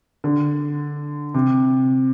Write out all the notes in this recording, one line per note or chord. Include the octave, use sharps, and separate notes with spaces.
D3
C3